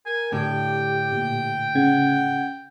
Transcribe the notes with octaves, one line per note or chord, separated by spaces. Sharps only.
A#4 G#5
A2 D3 G4 G5
A#2
C#3 F#5 G#6